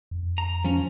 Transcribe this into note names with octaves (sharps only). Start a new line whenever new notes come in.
F2
A#5
F3 C#4